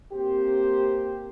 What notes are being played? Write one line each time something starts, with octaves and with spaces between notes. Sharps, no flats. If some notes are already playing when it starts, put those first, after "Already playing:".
A#3 C4 G4 C5